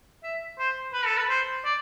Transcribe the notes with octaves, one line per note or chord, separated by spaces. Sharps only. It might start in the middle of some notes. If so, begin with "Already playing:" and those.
E5
C5
B4
A4
B4
C5
D5